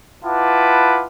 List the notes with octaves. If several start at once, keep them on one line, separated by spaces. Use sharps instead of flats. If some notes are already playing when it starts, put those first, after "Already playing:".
E4 F4 B4 F#5 A5 D6